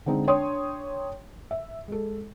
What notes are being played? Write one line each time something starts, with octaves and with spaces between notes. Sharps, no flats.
D3 G#3 C4 D#4
D4 C#5 G5 C6 D#6
E5
G#3 A4